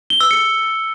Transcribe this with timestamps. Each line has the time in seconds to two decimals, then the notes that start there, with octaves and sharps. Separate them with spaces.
0.10 G7
0.21 E6
0.31 C#7